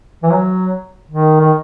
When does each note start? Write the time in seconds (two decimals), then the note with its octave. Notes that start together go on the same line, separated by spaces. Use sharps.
0.23 E3
0.31 F#3
1.11 D#3
1.40 D#3